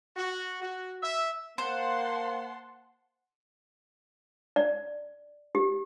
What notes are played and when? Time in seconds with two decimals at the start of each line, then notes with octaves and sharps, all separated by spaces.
0.16 F#4
0.61 F#4
1.02 E5
1.58 A#3 C5 F#5 A5 C6
4.56 D5
5.55 G4